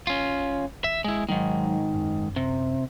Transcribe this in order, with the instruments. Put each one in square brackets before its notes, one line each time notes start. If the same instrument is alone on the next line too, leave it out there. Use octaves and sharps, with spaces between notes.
[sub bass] G1 [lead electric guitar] C#4 F4
[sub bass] G#1 [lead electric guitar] E5
[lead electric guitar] G#3 E4
[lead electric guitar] G#2 D#3 [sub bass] F#3
[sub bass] F#2
[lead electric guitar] C3